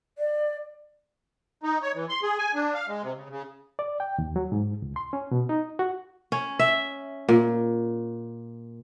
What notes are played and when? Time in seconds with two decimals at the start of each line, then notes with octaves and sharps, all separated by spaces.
0.18 D5
1.63 D#4
1.82 C#5
1.95 E3
2.09 C6
2.23 G#4
2.38 G#5
2.54 D4
2.74 F5
2.88 G#3
3.02 C3
3.16 C#3
3.30 C#3
3.79 D5
4.00 G5
4.18 D#2
4.36 F#3
4.52 G#2
4.82 C#2
4.96 C6
5.13 C#4
5.31 B2
5.49 D#4
5.79 F#4
6.32 C#4
6.59 E5
7.29 A#2